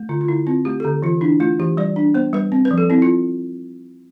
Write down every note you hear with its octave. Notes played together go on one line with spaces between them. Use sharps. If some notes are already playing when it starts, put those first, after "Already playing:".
Already playing: A3
D3 F4
F4
D3 E4
C4 F4
A3 G4
A4
D3 G4
E3 F4
D4 E4
A3 F4
E3 G4
G3 D5
D4
B3 C5
G3 B4
C4
B4
F3
A4
C4 E4
F4